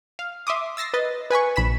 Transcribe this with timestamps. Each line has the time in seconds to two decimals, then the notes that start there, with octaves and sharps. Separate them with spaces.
0.19 F5
0.47 E5 C6 D6 D#6
0.77 E6 A6 A#6 C7
0.94 B4 D#5 A6
1.30 B4 G#5 B5 C#6
1.56 A#1 B5 B6 E7